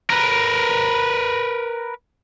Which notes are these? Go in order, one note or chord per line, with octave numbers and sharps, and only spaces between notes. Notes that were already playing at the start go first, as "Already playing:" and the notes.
A#4 B4